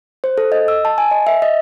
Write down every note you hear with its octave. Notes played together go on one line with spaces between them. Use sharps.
C5
A4
D#5
E6
A5
G#5
D#5
E5
D#5